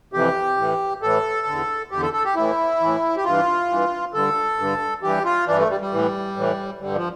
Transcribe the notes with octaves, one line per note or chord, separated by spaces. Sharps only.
F2 C3 E3 G4
A2 E3
A2 E3 A4
E2 D3
E2 D3 G4
A4
A4
G4
A2 E3 E4
A2 E3
G4
G2 E3 F4
G2 E3
G2 D3 A4
G2 D3
G2 E3 G4
F4
G2 E3 D4
A3
G3
G3
A2 E3
A2 E3
G2 D3 G3
F3